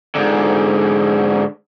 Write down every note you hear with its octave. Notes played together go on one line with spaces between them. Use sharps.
G#2 D3